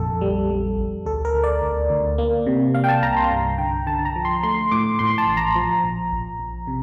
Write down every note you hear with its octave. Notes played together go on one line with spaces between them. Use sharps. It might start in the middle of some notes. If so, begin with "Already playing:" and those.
Already playing: A#1 F2 A4
G3
G3
A#1
D2 A4
A#4
D2
D5
D2
D2
A#3
C3
A#3 F5
G5
A5
C2 A#5
C6
G2 A#5
D3 G5
D3 A5
A#5
F3
C6
A3 C6
A2 D6
A2 C6
A5
A1
A#5
F3
A#1
A#1
A#1
C3